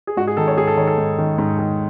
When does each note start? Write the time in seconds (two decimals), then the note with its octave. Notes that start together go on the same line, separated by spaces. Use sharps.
0.07 G#4
0.17 G#2 F#4
0.27 G#4
0.37 D#3 A4
0.48 C#5
0.58 G#2 G#4
0.67 A4
0.77 D#3 C#5
0.87 A4
0.98 G#2
1.19 D#3
1.38 G#2
1.59 D#3